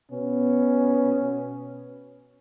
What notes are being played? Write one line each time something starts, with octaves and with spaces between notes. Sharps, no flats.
B2 B3 C#4